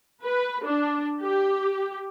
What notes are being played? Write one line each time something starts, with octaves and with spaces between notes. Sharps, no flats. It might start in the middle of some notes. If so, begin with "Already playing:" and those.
B4
D4
G4